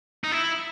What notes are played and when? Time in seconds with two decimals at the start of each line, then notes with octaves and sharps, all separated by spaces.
0.24 D#4
0.32 E4